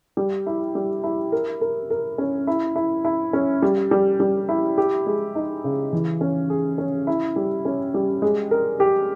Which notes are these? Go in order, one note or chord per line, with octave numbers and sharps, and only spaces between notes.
G3
E4
G3
E4
A#4
A#4
A#4
C#4
E4
E4
E4
C#4
G3
G3
G3
E4
G4
G#3
D#4
C#3
E3
C#4
G#4
C#4
E4
G3
C#4
G3
G#3
A#4
G4